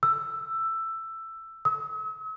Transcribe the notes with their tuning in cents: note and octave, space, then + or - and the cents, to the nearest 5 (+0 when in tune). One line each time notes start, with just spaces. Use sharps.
E6 +10
E6 -45